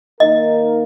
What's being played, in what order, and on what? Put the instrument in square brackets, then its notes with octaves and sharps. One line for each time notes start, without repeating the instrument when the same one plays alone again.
[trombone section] D#3 A#3 D#4 A#4 [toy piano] D#5